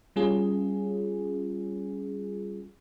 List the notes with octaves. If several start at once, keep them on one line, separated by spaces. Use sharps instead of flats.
G3 C#4 F4 G#4